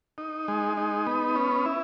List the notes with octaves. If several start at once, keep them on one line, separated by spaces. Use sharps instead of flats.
D#4
G#3
D#4
B3
C#4
E4